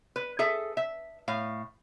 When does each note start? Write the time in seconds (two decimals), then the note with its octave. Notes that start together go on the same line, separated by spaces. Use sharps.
0.16 B4
0.39 G#4 A4 E5
0.77 E5
1.28 A2 F5